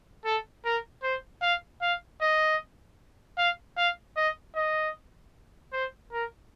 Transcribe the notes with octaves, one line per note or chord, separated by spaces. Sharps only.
A4
A#4
C5
F5
F5
D#5
F5
F5
D#5
D#5
C5
A#4